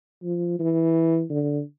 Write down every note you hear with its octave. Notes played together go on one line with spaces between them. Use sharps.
F3
E3
D3